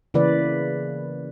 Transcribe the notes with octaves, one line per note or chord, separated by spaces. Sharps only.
C#3 E3 A#3 B4 D5